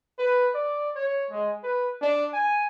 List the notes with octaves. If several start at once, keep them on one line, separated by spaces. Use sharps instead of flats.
B4
D5
C#5
G#3
B4
D4
G#5